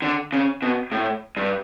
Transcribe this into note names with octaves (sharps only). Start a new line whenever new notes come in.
D3
C#3
B2
A2
G2